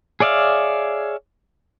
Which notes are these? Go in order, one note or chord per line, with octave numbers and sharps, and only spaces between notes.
G#4 C#5 D5 E5 F5